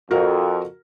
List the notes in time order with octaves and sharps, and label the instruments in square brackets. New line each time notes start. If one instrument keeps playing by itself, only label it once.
[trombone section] F2 [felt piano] F#4 A#4